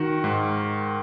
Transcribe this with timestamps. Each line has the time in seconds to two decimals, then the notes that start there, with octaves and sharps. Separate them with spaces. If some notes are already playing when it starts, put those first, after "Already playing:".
Already playing: D#3 F#4
0.24 G#2